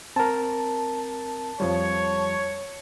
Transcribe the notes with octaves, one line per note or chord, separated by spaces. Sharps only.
C4 A#4 A5
F2 F3 G3 C#5